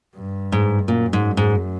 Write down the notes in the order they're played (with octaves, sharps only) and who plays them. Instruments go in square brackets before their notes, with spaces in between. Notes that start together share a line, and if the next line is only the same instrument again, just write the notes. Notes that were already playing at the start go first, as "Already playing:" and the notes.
[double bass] G2
[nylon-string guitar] G#2
[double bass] F#2 [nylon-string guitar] A#2
[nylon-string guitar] G#2
G#2